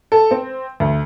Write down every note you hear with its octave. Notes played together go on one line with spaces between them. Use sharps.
A4
C4
D2